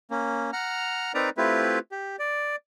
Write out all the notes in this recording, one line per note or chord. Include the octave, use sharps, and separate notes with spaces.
A#3 C#4
F#5 A#5 F6
C4 D#4 A#4 B4 D5 A#5
A3 C4 E4 F4 G4 B4
G4
D5